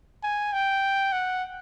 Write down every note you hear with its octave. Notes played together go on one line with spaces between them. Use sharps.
G#5
G5
F#5